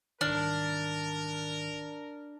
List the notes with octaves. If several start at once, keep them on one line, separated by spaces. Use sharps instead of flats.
C2 G#2 D#3 D4 A#4 F6